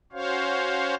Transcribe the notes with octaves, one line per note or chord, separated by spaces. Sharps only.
C#4 F#4 C5 C#5 F5